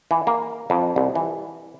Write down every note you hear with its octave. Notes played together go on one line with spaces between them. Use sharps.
E3
A#3
F2
C2
E3